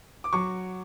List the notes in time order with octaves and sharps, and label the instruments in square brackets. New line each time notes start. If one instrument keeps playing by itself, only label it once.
[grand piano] D6
F#3 C#6